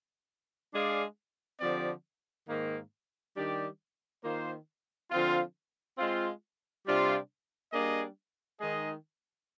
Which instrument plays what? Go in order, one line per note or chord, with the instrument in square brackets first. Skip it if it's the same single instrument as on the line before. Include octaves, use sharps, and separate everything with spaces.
[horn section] G#3 D4 G#4 D5 F5
D3 F3 C4 G4 D5
G#2 D#3 A#3
D#3 G3 D4 G4 D5
D#3 A#3 F4 C5
D3 F3 C4 F4
G#3 C4 F4
C3 G3 D4 F4 C5
G3 A#3 D4 G#4 D#5
D#3 G#3 D#4 G#4 D#5